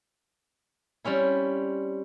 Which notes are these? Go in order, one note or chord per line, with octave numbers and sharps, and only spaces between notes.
G3 C4 C#4 E4